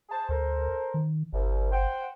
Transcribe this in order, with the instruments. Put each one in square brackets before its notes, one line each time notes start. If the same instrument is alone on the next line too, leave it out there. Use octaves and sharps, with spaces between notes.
[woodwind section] G#4 C5 A5
[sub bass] D2 [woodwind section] A4 A#4 C5
[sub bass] D#3
[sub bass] G1 [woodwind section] C2
[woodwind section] C5 F#5 G5